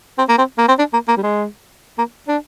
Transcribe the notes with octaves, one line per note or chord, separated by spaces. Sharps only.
C4
A#3
C4
A#3
C4
D4
A#3
A#3
G3
G#3
A#3
D4